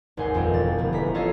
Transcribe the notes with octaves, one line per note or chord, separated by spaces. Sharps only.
G#1 D#2 F#5 G#5 C6
A#1 F2 B2 A#3 D#5 G5
E1 A6
G1 A3
A1 A#5 B6
F4 A4 C#5 D#5 F5